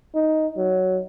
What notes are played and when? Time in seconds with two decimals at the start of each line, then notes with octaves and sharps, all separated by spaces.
0.15 D#4
0.57 F#3